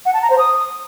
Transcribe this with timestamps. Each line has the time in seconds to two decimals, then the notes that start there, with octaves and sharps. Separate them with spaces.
0.06 F#5
0.14 A5
0.22 A#5
0.30 C5
0.38 D#6